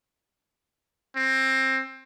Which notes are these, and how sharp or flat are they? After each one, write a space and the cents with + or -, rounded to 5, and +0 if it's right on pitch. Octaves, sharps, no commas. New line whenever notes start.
C4 +20